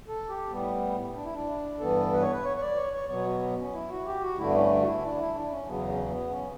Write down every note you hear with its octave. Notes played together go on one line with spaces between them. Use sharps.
A4
G4
A2 G3 B3
D4
E4
D4
G2 E3 B3 A4
B4
C#5
B4
C#5
C#5
D5
C#5
C#5
B2 F#3 B3 C#5
F#4
C#4
E4
F#4
G4
F#4
G2 D3 A3 E4
B3
C#4
D4
F#4
E4
D4
E4
D4
C#4
E2 C#3 F#3 B3
C#4
B3
C#4